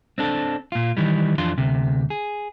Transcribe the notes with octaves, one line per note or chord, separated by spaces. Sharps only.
C4 D4 A4
A#2 F4
D#3 E3 G3
F2 E3 D4 F4 C6
D2 C3
G#4